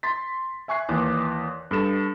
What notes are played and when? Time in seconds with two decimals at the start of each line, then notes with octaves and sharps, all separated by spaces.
0.03 C6 A6 B6
0.68 E5 G#5 C#6 F#6 C7
0.89 D#2 E3 D5 D6 F#6
1.71 G2 A4 E7